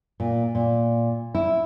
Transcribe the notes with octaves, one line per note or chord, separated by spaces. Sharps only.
A#2
A#2
E4